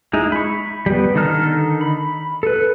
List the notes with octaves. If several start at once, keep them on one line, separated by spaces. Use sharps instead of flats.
G#3 D#4 E4
B5 C#6
G3 B3
D3 D#3 D#4 A4 F6
B5
A4 B4